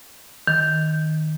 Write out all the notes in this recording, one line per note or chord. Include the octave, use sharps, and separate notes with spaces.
D#3